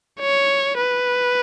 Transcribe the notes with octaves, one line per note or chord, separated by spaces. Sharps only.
C#5
B4